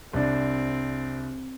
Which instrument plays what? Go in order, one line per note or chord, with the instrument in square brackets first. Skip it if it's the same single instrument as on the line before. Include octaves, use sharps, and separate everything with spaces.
[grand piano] C2 D4 [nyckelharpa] C4